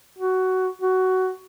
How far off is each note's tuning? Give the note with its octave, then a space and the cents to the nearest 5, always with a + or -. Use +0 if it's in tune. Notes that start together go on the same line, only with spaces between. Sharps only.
F#4 +15
F#4 +15